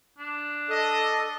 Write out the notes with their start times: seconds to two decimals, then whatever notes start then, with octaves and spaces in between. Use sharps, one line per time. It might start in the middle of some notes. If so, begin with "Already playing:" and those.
0.18 D4
0.68 A4 D#5